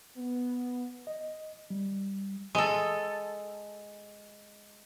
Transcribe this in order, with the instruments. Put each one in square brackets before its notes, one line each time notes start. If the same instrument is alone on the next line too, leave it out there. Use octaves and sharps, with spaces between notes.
[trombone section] B3
[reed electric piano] D#5
G3
[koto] G#3 A4